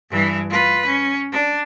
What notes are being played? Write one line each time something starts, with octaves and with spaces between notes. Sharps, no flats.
G2 E3
F4 B4
C#4
D4